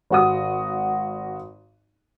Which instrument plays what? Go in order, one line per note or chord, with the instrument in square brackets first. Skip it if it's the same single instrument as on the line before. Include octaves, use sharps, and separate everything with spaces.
[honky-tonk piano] G#1 F#4 D#6